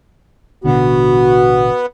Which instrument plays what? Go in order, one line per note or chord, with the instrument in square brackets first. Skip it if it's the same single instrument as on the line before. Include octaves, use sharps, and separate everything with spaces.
[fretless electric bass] A1 B2 D3 [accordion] B3 [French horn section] F#4